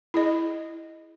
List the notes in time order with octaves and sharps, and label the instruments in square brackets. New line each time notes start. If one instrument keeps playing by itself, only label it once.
[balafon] E4 G#4 D#5